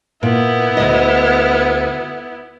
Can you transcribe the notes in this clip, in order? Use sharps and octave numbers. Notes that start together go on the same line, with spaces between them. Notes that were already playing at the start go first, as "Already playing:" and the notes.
A#2 B3 E4
D2 D#5